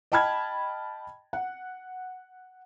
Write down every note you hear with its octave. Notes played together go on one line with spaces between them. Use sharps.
D#5 G5 A5 B5 F6 G#6
F#5